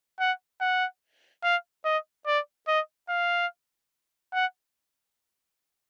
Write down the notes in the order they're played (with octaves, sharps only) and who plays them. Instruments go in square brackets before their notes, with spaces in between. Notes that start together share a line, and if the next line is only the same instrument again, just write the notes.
[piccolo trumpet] F#5
F#5
F5
D#5
D5
D#5
F5
F#5